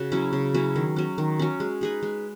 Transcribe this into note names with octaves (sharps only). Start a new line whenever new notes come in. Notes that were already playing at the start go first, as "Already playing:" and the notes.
Already playing: C#3 F#4 C#5
F#3 C#4 E4
C#3
F#3 C#4 E4
D#3
F#3 C#4
D#3
F#3 C#4
G#3
D#4 G#4 B4
G#3